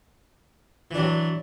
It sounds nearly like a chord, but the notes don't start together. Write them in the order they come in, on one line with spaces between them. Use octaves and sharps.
E3 D4 F#3